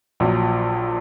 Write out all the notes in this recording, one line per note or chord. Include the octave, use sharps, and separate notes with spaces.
A#1 A#2 F#3